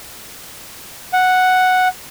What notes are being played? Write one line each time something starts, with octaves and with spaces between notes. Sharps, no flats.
F#5